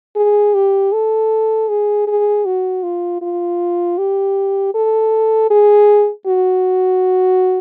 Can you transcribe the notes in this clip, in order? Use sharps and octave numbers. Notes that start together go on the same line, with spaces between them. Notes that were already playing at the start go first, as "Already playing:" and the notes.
G#4
G4
A4
G#4
G#4
F#4
F4
F4
G4
A4
G#4
F#4